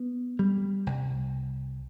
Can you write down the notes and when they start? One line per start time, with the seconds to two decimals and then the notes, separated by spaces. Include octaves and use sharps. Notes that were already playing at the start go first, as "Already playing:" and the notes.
Already playing: B3
0.39 G3
0.87 C2